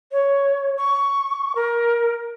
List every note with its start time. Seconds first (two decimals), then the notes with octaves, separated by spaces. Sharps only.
0.12 C#5
0.77 C#6
1.56 A#4